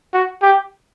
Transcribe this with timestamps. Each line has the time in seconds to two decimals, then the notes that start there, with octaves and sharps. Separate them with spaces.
0.14 F#4
0.42 G4